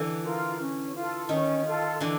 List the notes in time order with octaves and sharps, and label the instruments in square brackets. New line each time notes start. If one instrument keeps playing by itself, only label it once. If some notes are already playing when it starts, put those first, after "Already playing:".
Already playing: [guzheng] D3 E3
[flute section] F4 A#4
C#4
F4
A4
[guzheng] D#3 [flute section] C#4
[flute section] F4 A4
[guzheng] D3 E3 [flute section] D4